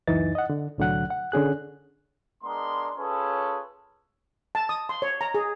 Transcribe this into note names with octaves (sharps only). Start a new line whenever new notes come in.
C#2 F#2 E3 D#4 A6
D#5 F#5
D3
C2 A2 D3 F#3 F#5 F#6
F#5
D3 C#4 G#4 F#6
G#3 B3 D4 A#4 C6
C#4 F4 G#4 A4 B4 C#5
A5
D#6
C6
C#5
A#5
G#4